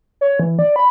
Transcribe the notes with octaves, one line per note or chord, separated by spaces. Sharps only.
C#5
E3
D5
B5